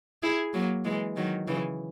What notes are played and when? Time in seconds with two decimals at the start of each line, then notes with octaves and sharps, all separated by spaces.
0.23 E4 G#4
0.54 F#3 A#3
0.85 E3 G#3
1.17 D#3 F#3
1.48 C#3 E3